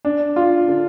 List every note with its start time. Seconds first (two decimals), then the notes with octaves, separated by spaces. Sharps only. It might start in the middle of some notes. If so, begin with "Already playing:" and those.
0.05 D4
0.36 F4
0.68 D3